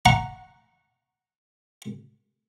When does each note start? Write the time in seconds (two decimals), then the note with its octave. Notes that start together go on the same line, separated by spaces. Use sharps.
0.06 F#5 A#5 C#6